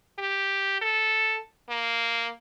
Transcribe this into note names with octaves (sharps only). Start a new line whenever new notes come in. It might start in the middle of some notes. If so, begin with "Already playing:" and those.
G4
A4
A#3